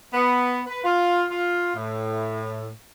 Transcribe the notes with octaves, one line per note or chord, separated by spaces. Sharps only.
B3
B4
F4
F4
A2